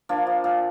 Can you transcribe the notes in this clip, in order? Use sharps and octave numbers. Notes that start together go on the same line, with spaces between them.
F3 A#3 D4
F3
A#2